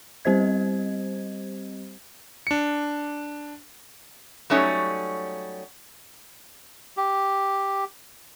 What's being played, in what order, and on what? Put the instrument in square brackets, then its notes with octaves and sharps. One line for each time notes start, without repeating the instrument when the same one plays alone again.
[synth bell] G3 C4 G4 C5 D#5 G#6
[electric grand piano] D4 C#7
[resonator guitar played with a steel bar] F#3 G3 A3 C#4 D#4 C#5
[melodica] G4